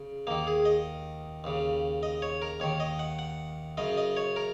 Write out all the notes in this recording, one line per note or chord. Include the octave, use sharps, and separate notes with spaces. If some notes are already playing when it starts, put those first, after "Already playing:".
Already playing: C#3
D#2 D#3 A#3
G#4
D#5
D#2 C#3
D#5
C#5
A#4
D#2 D#3 C#5
D#5
F#5
F#5
F#2 C#3 D#5
D#5
C#5
A#4